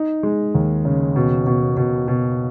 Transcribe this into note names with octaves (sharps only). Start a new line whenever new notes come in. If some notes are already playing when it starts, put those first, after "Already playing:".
Already playing: D#4
G#3
D#2
C#3
B2
B2
B2
B2